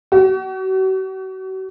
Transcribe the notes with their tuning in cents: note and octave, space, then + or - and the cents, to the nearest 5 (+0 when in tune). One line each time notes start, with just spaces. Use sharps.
F#4 +40